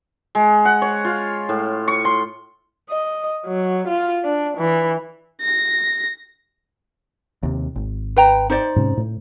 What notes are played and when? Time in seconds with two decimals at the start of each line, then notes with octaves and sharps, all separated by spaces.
0.35 G#3
0.65 F#5
0.82 C#5
1.05 F4
1.49 A2
1.88 C#6
2.05 C6
2.89 D#5
3.46 F#3
3.88 F4
4.24 D4
4.58 E3
5.41 A#6
7.43 D#2 C3
7.76 G#1
8.16 B4 G5 A#5
8.50 D#4 C5 D5
8.76 G#2 C3 C#4
8.97 A2